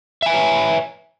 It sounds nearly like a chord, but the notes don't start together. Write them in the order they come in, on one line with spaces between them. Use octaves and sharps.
E5 G#5 B4 C#5